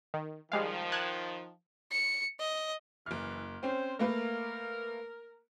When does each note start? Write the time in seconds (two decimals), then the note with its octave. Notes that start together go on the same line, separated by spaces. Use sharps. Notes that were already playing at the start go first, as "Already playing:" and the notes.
0.14 D#3
0.52 D#3 F3 G3 G#3 F5
0.92 A5 F#6 G#6
1.91 C#7
2.39 D#5
3.06 F#1 E3 F6
3.63 C4 C#4 C5
3.99 A3 A#3 A#4 B4